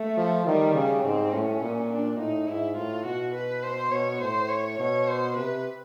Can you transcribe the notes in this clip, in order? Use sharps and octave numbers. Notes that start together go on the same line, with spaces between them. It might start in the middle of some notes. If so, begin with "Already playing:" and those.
Already playing: A3
F3
D#3 G3
C#3
G#2 C4
A2 C#4
A#2
D4
A2 D#4
G#2 E4
A2 F4
B2 F#4
B4
C5
B2 C#5
A2 C5
C#5
B2 C#5
C5
C3 B4